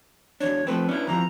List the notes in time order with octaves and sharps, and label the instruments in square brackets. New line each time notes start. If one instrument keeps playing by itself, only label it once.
[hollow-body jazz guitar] E2 D4 [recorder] C#5
[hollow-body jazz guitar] F3 A3 C4 [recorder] B4
[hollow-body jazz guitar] C#4 D4 E4
[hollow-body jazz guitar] F2 E3 F3 [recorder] A#5